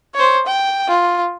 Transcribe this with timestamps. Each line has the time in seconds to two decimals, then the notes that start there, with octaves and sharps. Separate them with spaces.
0.15 C5 C#5
0.47 G5
0.88 F4